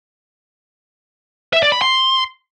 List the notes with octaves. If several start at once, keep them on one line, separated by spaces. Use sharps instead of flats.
E5
D5
B5
C6